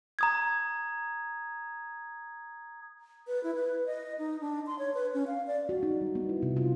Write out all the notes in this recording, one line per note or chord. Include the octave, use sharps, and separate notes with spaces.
A#5 D#6 G#6
B4
E4
B4
D#5
D#4
D4
C6
C#5
B4
C#4
F5
D5
F#4
D#4
G3
B3
E4
C3
F4